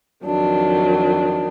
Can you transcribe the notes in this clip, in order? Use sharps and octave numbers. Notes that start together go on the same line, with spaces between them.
F2 D#3 F#3 D4